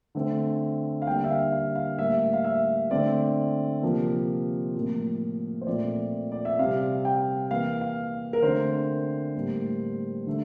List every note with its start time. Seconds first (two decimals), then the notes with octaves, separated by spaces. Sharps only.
0.15 D3 A3 C4
1.02 F5
1.07 D3 G3 A#3 G5
1.24 E5
1.30 F5
1.52 F5
1.75 F5
1.98 A2 G3 A#3 E5
2.33 F5
2.44 E5
2.91 D3 A3 C4 D5
3.83 C3 F3 A#3
4.74 A2 F3 A#3
5.61 C5
5.67 A#2 F3 A3 C4 D5
6.32 D5
6.45 E5
6.59 C3 G3 C4 F5
7.05 G5
7.51 E3 A#3 F5
7.81 F5
8.33 A#4
8.42 D3 A3 C4 C5
9.35 A2 G3 A#3
10.27 D3 A3